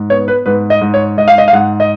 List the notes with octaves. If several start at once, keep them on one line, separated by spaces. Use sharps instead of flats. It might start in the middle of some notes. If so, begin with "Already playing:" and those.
Already playing: G#2
B3 C#5
B4
G#2 B4
D#5
G#2
C#5
G#2 D#5
F5
D#5
F5
G#2 F#5
D#5